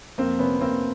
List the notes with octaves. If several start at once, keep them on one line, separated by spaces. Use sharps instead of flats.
F2 A#3 C4
C3 B3 C#4
C3 A#3 C4